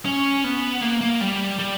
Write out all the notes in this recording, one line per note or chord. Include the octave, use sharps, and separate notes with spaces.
C#4
B3
A#3
A#3
G3
G3